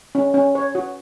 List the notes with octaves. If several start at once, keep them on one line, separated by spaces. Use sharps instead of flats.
C#4
C#4
C#5
F#4